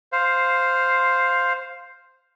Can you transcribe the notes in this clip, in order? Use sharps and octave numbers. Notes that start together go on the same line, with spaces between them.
C5 F5